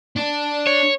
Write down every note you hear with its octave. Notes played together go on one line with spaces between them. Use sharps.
D4
C#5